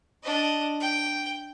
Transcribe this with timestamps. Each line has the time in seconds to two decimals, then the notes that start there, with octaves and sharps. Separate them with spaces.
0.23 D4 D#5
0.80 G5